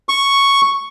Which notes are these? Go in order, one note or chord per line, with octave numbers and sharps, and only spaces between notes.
C#6